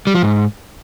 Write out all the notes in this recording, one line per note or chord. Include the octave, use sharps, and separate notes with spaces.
G3
F3
G#2